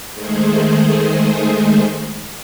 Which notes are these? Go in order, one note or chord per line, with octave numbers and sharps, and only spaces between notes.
D#3 G#3 A3 G#4 C5